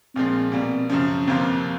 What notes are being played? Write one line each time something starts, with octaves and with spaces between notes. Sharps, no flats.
A#1 A#2 F3 G#3 C4
B2 G3 A#3 C4
F#2 C#3 F3 C#4
G1 F2 C3 F3 A#3 C4